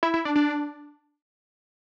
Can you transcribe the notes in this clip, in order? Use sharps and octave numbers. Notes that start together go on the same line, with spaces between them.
E4
E4
D4
D4